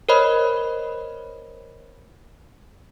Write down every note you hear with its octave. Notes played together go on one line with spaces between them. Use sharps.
A#4 C5 C#5 D#5 B5